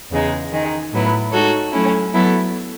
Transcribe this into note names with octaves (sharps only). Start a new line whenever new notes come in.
E2 C#3 G#3 D#4
D#3 G#3 D#4
A2 F#3 B3 E4
G#3 D#4 F#4 A4 C#5
F#3 A3 C#4 E4
F#3 B3 E4 A4